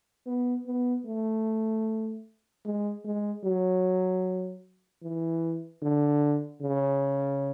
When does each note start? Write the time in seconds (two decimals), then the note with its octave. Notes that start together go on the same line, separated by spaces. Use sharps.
0.27 B3
0.67 B3
1.06 A3
2.65 G#3
3.05 G#3
3.44 F#3
5.03 E3
5.82 D3
6.62 C#3